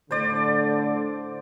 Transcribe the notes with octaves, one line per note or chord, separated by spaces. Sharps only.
A2 D3 C5 D5